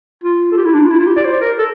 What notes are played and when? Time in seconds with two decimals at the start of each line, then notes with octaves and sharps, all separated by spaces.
0.24 F4
0.52 A4
0.57 G4
0.65 E4
0.74 D4
0.82 F4
0.90 E4
0.99 F4
1.07 G4
1.16 D5
1.25 C5
1.41 A#4
1.58 A4